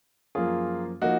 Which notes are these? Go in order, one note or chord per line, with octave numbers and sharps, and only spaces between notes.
F#2 F3 A#3 F4 G#4
F3 A#3 D#4 F#4